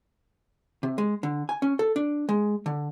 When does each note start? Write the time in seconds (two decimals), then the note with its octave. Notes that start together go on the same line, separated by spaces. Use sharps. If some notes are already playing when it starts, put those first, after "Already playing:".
0.83 C3
0.98 G#3
1.23 D3
1.49 G#5
1.62 C#4
1.79 A4
1.96 D4
2.29 G#3
2.66 D3